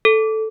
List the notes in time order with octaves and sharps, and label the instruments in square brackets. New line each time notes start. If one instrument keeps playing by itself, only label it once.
[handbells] A4